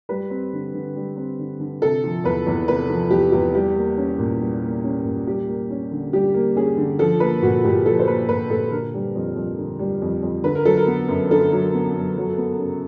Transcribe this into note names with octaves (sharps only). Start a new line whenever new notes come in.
G3 B4
C4
D3
D3
G3
C4
D3
D3
C3 A4
F3
E2 B4
E2
C3 B4
F3
E2 G4
E2 G4
G3 G4
A#3
C#4
A#2
G3
A#3
C#4
A#2
G3 G4
A#3
C#4
D3
G3 G4
A#3
C#4 G#4
D3
F3 A4
A#3 B4
A#2 F#4
A#2 G4
F3 A4
C5
A#3 B4
A#2 B4
A#2 A4
D3 A#4
G3
F2
F2
D3
G3
F2
F2
D3 B4
A#4
F#3 A4
A#4
B3
F#2
D3 A4
F#3
B3
F#2
F#3
B3
C#3